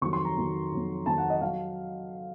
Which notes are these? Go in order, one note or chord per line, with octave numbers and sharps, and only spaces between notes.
F2 D#3 F#3 C#6
C6
A#5
F2 D#3 F#3
F2 D#3 F#3
F2 D#3 F#3 A5
F#5
D#5
F#3 F5